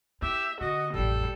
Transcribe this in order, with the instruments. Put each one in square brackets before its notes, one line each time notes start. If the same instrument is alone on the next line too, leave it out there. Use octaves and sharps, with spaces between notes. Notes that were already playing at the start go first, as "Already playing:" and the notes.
[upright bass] E4 [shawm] G4 [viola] E5
[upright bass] D3 [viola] F#4 [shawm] D#5
[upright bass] A1 F2 [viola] G3 [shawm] A4